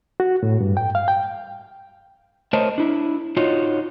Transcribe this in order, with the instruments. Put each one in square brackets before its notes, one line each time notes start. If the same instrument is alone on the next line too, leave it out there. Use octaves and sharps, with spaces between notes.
[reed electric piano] F#4
A2
G2
G5
F5
G5
[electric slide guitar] A3 A#4 C5 C#5 D#5 A5
D4 E4
D#4 F4 F#4 C#5 D#5